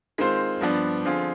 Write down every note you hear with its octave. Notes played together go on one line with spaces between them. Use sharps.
D#3 G#3 C4 F4 C5
G2 F3 B3 D4
D3 F3 C4 F4 G#4